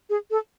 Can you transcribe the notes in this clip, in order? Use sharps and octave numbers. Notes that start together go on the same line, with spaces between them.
G#4
A4